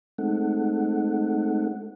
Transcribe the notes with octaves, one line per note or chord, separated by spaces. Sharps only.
G#3 A3 C4 D#4 A4 F#5